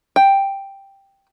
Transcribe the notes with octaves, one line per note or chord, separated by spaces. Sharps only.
G5